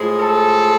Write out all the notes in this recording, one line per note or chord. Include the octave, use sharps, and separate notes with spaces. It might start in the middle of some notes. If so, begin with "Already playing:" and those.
Already playing: A2 F3 G#3
A4